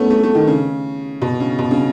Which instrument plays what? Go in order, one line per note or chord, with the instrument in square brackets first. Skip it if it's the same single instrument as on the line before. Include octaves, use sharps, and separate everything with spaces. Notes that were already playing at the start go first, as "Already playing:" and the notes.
Already playing: [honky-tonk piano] A3 B3 C#4
A3
A3
D#3
C#3
B2
C#3
B2
C#3